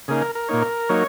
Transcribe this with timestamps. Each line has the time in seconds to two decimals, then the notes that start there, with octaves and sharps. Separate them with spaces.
0.08 C#3 A#3 D#4 G#4
0.22 A#4
0.35 A#4
0.48 A#2 A#3 D#4 C#5
0.62 A#4
0.89 F#3 A#3 D#4 C#5